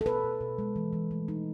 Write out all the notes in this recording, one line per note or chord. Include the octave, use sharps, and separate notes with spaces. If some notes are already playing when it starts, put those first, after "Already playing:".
A4
B2 B4
B2
B2
G#3
E3
E3
A3
D#4